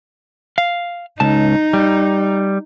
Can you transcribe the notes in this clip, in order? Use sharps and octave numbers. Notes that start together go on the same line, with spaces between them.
F5
C#2 D#4 A5
G3